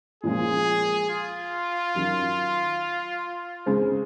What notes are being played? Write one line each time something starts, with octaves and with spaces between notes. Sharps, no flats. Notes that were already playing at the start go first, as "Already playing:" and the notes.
A#2 F3 G#3 C#4 F4 G#4
F4
D#3 F#3 C#4
C#3 G#3 C4